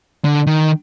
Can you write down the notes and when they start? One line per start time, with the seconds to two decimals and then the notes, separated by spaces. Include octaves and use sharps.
0.25 D3
0.47 D#3